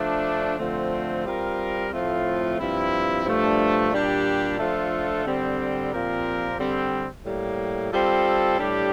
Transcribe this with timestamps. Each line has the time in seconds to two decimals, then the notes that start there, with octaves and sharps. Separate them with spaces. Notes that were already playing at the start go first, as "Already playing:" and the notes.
Already playing: F3 A3 D4
0.58 D3 F3 A3 C4
1.25 G3 C4 F4 A#4
1.92 A2 F3 A3 C4 F4
2.58 G2 F3 C4 E4
3.24 G2 F3 A3 D4
3.91 A#2 G3 D4 G4
4.57 F3 A3 D4 F4 A4
5.25 D3 G3 C4
5.91 A#2 F3 C4 G4 A#4
6.57 D3 G3 C4
7.24 A2 G3 A#3
7.91 G3 C4 F4 A4
8.58 A2 G3 D4 G4